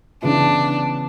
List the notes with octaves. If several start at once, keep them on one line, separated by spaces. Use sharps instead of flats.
C#3 E3 B3 D4 E4